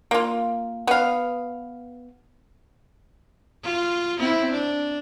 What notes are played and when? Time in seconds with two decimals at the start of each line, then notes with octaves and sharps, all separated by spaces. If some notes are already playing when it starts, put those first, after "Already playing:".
0.11 A#3 F4
0.87 B3 F5
3.63 F4
4.19 C4 E4
4.52 D4